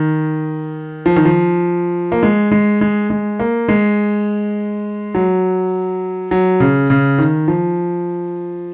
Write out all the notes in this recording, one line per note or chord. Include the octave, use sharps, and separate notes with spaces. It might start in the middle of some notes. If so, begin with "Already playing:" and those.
Already playing: D#3
F3
D#3
F3
A#3
G#3
G#3
G#3
G#3
A#3
G#3
F#3
F#3
C#3
C#3
D#3
F3